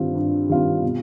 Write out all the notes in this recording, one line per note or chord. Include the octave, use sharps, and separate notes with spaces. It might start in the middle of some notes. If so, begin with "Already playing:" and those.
Already playing: G2 D#3 G3 C4 F4
G2
D#3 G3 C4 F4
B2